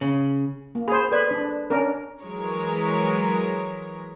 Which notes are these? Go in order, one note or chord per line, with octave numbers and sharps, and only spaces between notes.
C#3
A#3
G#4 C5 B5
A4 B4 D5
D4
C#4 D4 A#4
E3 F#3 G#3 A#4 C#5